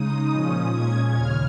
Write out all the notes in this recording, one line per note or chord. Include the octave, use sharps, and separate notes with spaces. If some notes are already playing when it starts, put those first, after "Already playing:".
Already playing: C#3 G#3 D#4 D#6
A#2 F3 C#4
A#2 G#3 C#4 G#6
D#2 C#3 F6